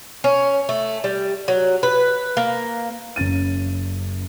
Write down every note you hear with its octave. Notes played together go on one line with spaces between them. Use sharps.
C#4
A3
G3
F#3
B4
A#3
F#1 C#4 A6 D#7